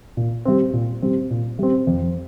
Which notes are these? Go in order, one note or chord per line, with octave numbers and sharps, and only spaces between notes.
A#2
G3 C4
A#2
G3 C4
A#2
G3 C4
F2